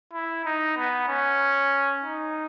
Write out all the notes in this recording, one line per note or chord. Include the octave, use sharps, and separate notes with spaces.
E4
D#4
B3
C#4
D#4